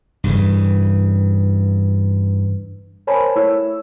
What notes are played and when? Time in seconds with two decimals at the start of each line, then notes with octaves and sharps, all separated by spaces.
0.24 G2 C#3 E3
3.07 A#4 C5 C#5 G#5 A5 B5
3.35 A3 E4 C#5 E6